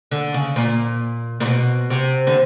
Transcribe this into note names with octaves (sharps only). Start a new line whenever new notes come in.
D3
C#3
A#2
A#2
B2
C3
D3